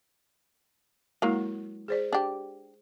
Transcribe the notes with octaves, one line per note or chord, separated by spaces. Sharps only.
F#3 G#3 A#3 E4
G#4 C5 D5
D4 G4